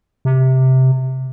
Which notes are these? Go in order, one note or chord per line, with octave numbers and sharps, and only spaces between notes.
C3